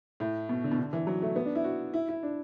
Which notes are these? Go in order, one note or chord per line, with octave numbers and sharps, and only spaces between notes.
A2
B2
D3
B2
D3
E3
F#3
A3
B3
D4
E4
F#4
E4
E4
D4